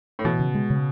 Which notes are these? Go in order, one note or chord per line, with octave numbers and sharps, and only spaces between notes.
A2
B2 E3
C#3
G#3
C#3